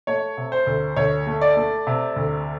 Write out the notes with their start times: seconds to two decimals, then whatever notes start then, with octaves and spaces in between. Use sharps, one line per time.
0.07 A3 C#5
0.37 C3
0.52 C5
0.67 D2
0.96 D2 C#5
1.27 A3
1.41 D5
1.57 A3
1.87 C3
2.16 D2